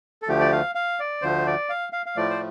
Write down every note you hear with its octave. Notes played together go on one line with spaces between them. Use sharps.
A4
D2 D3 F3 A3 G4
D5
F5
F5
D5
D2 D3 F3 A3 C5
D5
F5
F5
F5
A2 F3 A3 D5
C5